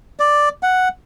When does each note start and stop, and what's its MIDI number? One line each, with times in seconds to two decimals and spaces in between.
0.20 0.49 74
0.63 0.88 78